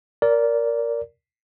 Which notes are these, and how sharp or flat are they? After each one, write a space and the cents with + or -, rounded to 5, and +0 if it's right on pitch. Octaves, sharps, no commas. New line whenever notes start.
A#4 +0 D5 -20